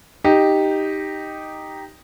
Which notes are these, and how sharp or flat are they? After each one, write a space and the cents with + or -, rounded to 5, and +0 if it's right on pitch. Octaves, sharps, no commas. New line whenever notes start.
D#4 +0 G4 +0